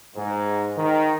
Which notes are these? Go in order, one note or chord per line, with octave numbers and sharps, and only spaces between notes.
G#2
D#3